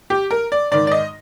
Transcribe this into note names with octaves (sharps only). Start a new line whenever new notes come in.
G4
A#4
D5
G#2 D#3 D5
D5
D#5